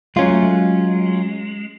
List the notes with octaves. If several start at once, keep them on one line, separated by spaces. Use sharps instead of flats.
F#3 G#3 C#4 F4
A3
G#3